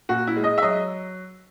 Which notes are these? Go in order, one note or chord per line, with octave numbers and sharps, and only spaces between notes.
A#2 F#4
E4
G#3
D#5
E5
F#3 D#5